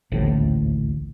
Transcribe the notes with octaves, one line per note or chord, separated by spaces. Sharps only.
D#1 A1 D2 A2